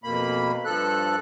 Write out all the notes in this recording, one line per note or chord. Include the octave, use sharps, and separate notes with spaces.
F2 B2 A#3 B5
G2 F3 A4 F#6